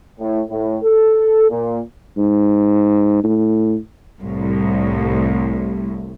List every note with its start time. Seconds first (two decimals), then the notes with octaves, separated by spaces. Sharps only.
0.19 A2
0.50 A2
0.83 A4
1.50 A#2
2.17 G#2
3.24 A2
4.20 C2 A2